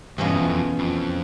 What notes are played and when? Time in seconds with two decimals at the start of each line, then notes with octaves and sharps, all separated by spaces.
0.18 E2 G2 B2 G#3 C#4 F4
0.34 F2
0.49 F2
0.79 F2